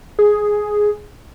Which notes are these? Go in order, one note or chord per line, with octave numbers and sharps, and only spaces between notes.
G#4